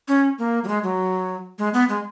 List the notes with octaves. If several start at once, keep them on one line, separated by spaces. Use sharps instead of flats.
C#4
A#3
F#3
G#3
F#3
G#3
B3
G#3